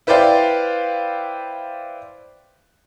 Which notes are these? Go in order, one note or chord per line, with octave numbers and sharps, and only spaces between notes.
E4 B4 C5 D5 F5 G5